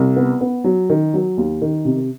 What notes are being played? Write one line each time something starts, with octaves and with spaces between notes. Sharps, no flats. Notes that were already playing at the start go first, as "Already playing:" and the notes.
Already playing: C2
B3
B3
F#3
D#3
F#3
D#2
D#3
C3